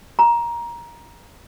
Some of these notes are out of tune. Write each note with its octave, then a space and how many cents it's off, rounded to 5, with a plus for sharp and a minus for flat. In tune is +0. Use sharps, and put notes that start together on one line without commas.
A#5 +15